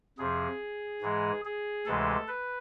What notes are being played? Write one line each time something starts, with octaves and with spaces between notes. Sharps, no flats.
F2 C3 F3 G#4
G#2 E3 G#3
G#4
D2 C3 E3 G#3 A4
B4